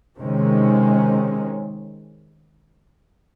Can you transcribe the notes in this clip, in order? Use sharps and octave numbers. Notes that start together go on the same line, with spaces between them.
C3 D#3 G#3 C#4